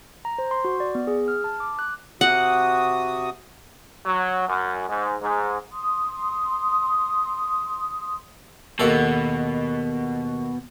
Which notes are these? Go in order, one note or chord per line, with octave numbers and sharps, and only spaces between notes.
A#5
C5
C6
F#4
D5
B3
G#4
F6
A5
D6
F#6
C3 F#4 F#5 D#6
F#3
F#2
G#2
G#2
C6 D#6
D#2 B2 A4